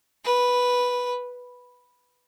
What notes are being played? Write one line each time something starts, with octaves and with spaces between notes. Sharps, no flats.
B4